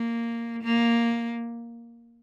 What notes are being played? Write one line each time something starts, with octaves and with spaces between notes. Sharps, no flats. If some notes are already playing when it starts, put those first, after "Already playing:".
Already playing: A#3
A#3